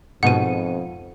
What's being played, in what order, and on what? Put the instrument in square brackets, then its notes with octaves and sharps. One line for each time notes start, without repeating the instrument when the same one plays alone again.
[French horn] F2 [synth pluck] G#2 B2 [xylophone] F#5 D#7